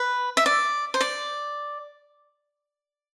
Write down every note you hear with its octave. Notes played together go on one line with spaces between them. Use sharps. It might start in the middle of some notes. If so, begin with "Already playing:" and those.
Already playing: B4
E5
D5
C5
D5